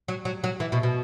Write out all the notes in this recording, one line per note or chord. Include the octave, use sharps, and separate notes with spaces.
F#3
F#3
F#3
E3
B2
B2